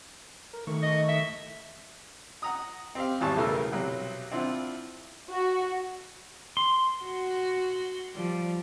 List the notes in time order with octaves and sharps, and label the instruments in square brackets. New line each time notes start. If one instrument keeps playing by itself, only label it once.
[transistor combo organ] A#4
D#3 A3 C#6
[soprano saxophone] D#5
E5
[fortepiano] F#5 A#5 D#6
C4 G4 F5
G#1 E2 G3 A5 C#6
B1 C#3 E3 A3 A#4 E6
B1 C3 F#3
C4 D4 E4 F4 F#5
[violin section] F#4
[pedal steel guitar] C6
[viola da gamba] F#4
F3 G3